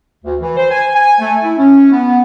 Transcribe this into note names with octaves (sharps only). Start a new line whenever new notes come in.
D2
E3
C5
G#5
G#5
A3
E4
C#4
B3